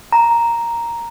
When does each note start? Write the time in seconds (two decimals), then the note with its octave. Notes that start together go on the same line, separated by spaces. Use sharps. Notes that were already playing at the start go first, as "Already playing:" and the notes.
0.13 A#5